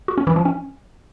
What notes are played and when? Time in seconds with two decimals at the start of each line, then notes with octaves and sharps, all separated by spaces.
0.08 F#4
0.18 C#4
0.27 E3
0.36 F3
0.45 C#4